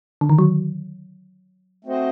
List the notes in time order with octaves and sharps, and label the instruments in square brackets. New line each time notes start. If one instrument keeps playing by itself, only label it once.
[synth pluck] D3
D#3
F#3
[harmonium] A3 C4 F#4 C5 D#5